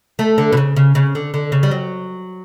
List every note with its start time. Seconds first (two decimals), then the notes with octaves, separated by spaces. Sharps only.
0.19 A3
0.38 D3
0.53 B2
0.57 C#3
0.77 C#3
0.95 C#3
1.15 D3
1.34 D3
1.52 C#3
1.63 G3
1.71 F#3